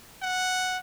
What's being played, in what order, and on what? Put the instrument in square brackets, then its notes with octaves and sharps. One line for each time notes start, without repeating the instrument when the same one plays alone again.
[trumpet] F#5